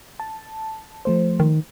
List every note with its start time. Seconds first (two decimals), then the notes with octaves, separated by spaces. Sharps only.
0.20 A5
1.05 F3 A3 C5
1.40 D#3